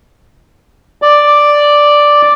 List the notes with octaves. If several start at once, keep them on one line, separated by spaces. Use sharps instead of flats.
D5